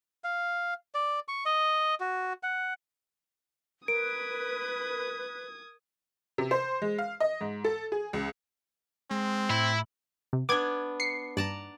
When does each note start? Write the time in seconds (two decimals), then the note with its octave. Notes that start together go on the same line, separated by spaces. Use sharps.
0.24 F5
0.94 D5
1.28 C#6
1.46 D#5
2.00 F#4
2.43 F#5
3.88 A#4 B4 D#6 G#6 D7
6.38 C3
6.51 C5
6.82 G#3
6.98 F5
7.20 D#5
7.41 G#2
7.64 A4
7.92 G#4
8.13 C#2
9.11 G#3 C4
9.50 A2 E4
10.33 C3
10.49 B3 D4 D6 G#6
11.00 C7 C#7
11.37 G2 D5 A5 A#5